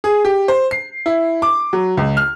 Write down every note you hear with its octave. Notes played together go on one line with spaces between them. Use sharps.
G#4
G4
C5
C7
E4
D6
F#3
C#2
F6